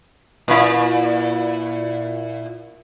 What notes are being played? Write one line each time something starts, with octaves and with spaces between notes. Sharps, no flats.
A#2 E4